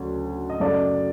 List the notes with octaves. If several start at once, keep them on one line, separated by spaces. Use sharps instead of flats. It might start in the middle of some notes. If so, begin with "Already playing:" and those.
Already playing: D2 C#3 F#3
D#5
F#2 C#3 F#3 A3 D5